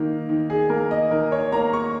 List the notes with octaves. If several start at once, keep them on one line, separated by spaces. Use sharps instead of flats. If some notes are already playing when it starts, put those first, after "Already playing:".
Already playing: D#3 A#3 D#4
D#3
G#4
A#3 A#4
D#5
D#3 A#4
C#5
A#3 A#5
C#6